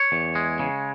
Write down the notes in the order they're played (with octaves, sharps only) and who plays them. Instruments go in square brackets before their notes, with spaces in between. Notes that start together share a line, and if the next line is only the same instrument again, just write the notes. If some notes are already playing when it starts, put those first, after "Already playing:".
Already playing: [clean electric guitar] C#5
E2
G#3
C#3